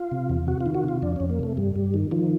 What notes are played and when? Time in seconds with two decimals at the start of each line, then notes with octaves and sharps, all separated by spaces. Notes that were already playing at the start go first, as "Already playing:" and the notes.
Already playing: F4
0.11 C3
0.29 E2
0.47 C3 F#4
0.61 F4
0.66 D#3
0.75 F#4
0.84 C3 F4
1.02 F2 D4
1.16 F2 C#4
1.29 A#3
1.39 C3 A3
1.57 G2 G3
1.76 G2
1.94 D#3
2.11 D#3 F3